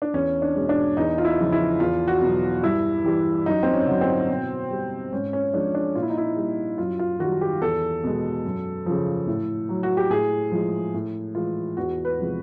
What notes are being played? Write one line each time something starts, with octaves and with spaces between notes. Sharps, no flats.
D4
E2 C#4
D4
B2 G#3
D4
E2 D#4
F4
E4
C#3 F3
E4
E2 F4
F#4
B2 F#3
G2 E4
E3 G3
F#2 D#4
C4
C#4
D3 F#3
C4
B2
G3
G#2 C#4
C#4
F3 G#3 D4
D4
A#2 F4
E4
D#4
E4
G3
F#2 F4
F4
D#3 G3 F#4
G4
E2 A4
B2 G#3
F#2
C#3 F3
A2
F#3
F#4
G4
A2 G#4
F3 G#3
A2
E3 G#3 F4
E2 F#4
B4
C3 F3 G#3